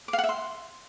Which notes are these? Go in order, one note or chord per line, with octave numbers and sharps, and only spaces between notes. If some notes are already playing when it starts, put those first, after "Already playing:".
D6
F5
F#5
E5
C6